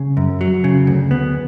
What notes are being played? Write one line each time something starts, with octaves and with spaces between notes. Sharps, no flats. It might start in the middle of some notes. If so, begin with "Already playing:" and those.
Already playing: C#3
F#2
F#3
C#3
D2
B3